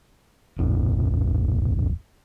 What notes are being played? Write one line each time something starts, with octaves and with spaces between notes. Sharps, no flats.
D1 A#1 F2 F3